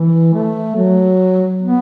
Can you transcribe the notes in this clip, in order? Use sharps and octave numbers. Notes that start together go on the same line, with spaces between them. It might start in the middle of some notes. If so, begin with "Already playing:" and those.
Already playing: E3
A3
F#3
B3